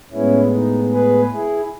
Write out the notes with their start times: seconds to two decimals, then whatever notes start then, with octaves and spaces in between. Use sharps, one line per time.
0.12 A2 G#3 B3 C#4 E4
0.52 D#4
0.93 G#4 B4
1.33 E4 G#4